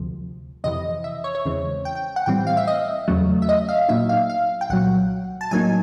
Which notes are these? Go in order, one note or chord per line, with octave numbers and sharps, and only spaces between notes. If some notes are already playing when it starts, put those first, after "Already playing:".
Already playing: D2 C3 F3
F2 C3 E3 D#5
E5
C#5
C#5
E2 C#3 E3 G#3 C4
G5
G5
F#5
A2 E3 G3 C4 G5
F5
E5
D#5
E2 C#3 F#3 A3
E5
D#5
F5
A#2 F#3 A#3 D#4 E5
F5
F5
G5
C2 A#2 F#3 F#5
A5
A2 F#3 A#3 D#4 G#5